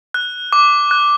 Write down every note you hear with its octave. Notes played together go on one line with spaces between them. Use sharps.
F#6
D6
F#6